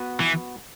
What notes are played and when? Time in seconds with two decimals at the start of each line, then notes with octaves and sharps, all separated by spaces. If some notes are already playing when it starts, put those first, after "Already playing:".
Already playing: B3 F#4 B4
0.20 E3